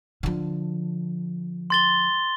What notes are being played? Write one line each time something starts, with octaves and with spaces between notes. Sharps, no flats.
D3 F3
C6 A6 G7